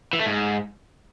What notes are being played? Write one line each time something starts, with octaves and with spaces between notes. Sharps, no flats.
E3
A3
G#2